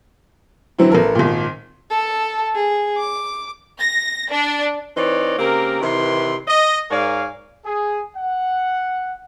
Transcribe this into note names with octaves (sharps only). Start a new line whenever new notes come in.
D3 E3 F#3 C4 E4
A1 A4 A#4
G#1 A#2
A4 A5
G#4
D6
A#6
D4
E3 C4 D#4 B4 C#5 D5
C#3 A#3 C4 G4 A#4
C3 D#3 E3 E4 B4 C6
D#5
G#2 A#4 C#5 D5 F5 G#5
G#4
F#5